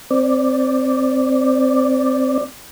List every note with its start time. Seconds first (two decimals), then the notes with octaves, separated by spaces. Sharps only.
0.11 C4 D5